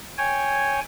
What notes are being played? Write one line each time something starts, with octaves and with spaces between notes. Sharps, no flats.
C#5 G5 G#5